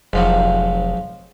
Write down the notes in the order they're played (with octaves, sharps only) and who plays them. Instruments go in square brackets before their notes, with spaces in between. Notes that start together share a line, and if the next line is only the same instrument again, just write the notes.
[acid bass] F1 [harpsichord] G#2 F3 F#3